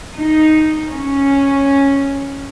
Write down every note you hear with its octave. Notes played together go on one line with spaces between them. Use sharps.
D#4
C#4